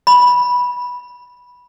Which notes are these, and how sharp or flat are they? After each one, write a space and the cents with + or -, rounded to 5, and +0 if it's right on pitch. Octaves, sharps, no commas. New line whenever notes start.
B5 -10